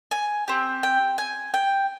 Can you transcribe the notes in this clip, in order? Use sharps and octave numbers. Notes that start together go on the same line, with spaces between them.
G#5
C4 G4
G5
G#5
G5